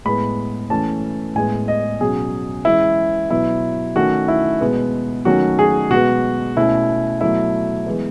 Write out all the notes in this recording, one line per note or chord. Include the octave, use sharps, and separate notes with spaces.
A2 G#3 B3 B5
E3 A3 C#4 A5
A2 G#3 B3 G#5
D#5
B2 F#3 C#4 G#4
E3 G#3 C#4 E4
B2 F#3 B3 E4
D#3 A3 C#4 F#4
E4
B2 G#3 B3
D#3 F#3 A3 C#4 F#4
G#4
B2 G#3 B3 F#4
B2 A3 C#4 E4
B2 F#3 A3 E4
E3 G#3 B3